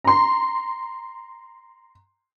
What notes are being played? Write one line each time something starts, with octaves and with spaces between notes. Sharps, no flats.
A#5 C6